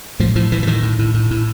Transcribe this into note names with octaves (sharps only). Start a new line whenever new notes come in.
A2 F3
A2 F3
A2 E3
E3
A2 D#3
A2
A2
A2
A2